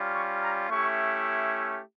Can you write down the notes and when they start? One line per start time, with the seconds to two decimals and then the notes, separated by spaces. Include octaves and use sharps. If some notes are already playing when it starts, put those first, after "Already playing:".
Already playing: G3 C#4 F4
0.13 C#6
0.41 A#5
0.69 A3 C#4 E4 G4 C#6